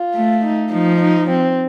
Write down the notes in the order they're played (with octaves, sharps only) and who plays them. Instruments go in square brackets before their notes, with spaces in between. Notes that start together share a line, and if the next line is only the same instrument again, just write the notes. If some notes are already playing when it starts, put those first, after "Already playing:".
Already playing: [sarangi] F4
[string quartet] A3
[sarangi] D#4
[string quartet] F3 [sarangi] D#4
[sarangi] D#4
C4